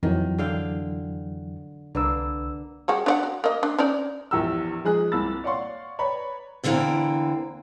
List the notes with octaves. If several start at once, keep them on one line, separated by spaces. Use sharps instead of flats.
F2 D#3 E3 F#3
D3 F5 G5
C2 D3 A#3 B4 E6
G3 G#3 F#4
D4 D5 F#5
F#4
A#3 D#5
D4
C#4 D#4 D5
A#1 E2 G4 A#4 A#5 E6
F3 G#3 D#4 G#4 D#6 F#6
C2 A#3 C4 B5 E6 A6
C#5 D5 F5 F#5 C6 C#6
B4 C#5 D5 A#5 B5
E2 D3 E3 G#3 A#3 C4